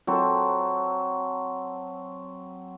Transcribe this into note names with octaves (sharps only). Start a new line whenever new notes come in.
F#3 C4 A4